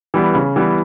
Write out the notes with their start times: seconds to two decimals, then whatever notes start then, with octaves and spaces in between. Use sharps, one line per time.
0.14 E3 G3 B3
0.35 C#3
0.56 E3 G3 B3